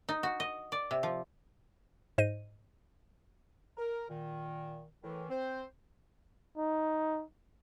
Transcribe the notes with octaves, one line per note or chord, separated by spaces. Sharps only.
D#4
F#4
D#5
D5
C3
F3
G#2 C5 D#5 D#7
A#4
A#2 D#3
A2 D#3 E3
C4 C5
D#4